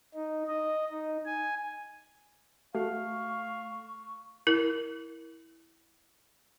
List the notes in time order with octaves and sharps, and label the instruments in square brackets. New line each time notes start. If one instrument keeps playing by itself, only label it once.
[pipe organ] D#4
D#5
D#4
G#5
[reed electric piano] A3 [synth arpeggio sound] F#4 [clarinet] F5 [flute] C#6
[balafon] E4 A#4